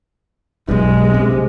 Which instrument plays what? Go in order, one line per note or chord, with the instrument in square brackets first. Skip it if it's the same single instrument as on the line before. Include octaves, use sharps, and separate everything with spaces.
[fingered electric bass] B1 G2 [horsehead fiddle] G#3
[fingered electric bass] C3